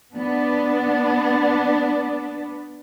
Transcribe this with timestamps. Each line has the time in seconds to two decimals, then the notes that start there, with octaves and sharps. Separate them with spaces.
0.14 B3 D4